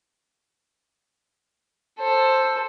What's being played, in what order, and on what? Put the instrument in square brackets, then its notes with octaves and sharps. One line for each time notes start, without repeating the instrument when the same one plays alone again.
[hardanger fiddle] A4 C5